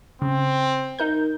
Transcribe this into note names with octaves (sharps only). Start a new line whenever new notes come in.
C#3 C4
D#4 A#4 G6